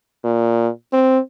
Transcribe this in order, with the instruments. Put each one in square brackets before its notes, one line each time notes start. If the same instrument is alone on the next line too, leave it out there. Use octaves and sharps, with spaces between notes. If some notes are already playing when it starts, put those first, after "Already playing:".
[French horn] A#2
C4